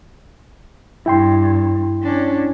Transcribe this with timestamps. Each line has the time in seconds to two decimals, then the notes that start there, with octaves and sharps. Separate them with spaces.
1.06 G2 E4 G5 C6
2.02 C#4 D4